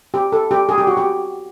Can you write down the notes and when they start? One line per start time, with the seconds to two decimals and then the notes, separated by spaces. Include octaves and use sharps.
0.14 G4
0.32 A4
0.51 G4
0.69 G#4
0.78 G4
0.87 F#4
0.97 G4